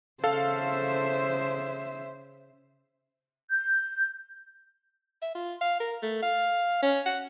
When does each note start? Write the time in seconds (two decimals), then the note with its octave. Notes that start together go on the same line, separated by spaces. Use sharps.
0.24 C#3 A4 C5 E5 F5
3.50 G6
5.22 E5
5.35 F4
5.61 F5
5.80 A#4
6.02 A3
6.22 F5
6.82 C#4
7.06 F#5